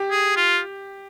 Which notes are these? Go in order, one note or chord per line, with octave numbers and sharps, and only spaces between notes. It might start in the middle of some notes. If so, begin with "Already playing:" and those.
Already playing: G4
G#4
F4